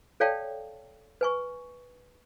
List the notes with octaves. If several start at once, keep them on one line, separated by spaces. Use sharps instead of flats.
A4 C#5 D5 F5 G5 A5
B4 G#5 C#6